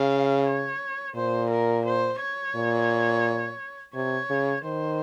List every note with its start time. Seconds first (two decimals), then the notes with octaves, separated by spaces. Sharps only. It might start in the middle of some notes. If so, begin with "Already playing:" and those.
Already playing: C#3 F5
0.46 C#5
1.15 A#2 C5
1.50 A#4
1.86 C5
2.21 C#5
2.56 A#2
3.94 C3 C#5
4.30 C#3
4.64 D#3 C5